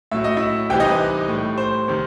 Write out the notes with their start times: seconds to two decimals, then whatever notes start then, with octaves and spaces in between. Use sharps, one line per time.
0.11 A2 F#3 E5
0.24 D#5
0.37 E4 E5
0.70 C2 C3 E3 G3 G4 G5
0.80 D#4 D#5
0.89 B4
1.28 A2 G3
1.58 C5
1.88 C3 D#3